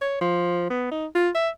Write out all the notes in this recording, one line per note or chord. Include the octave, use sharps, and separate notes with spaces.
C#5
F3
B3
D#4
F4
E5